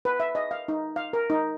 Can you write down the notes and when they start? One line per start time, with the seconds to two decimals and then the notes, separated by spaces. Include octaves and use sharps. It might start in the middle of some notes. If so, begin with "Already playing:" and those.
0.05 B4
0.20 E5
0.35 D#5
0.51 F5
0.68 D#4
0.96 F5
1.13 A#4
1.30 D#4